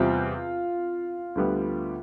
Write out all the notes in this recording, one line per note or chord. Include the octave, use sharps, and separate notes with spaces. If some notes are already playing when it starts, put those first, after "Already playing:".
Already playing: E2 C3 G3 C4 F4
D2 D3 G3 B3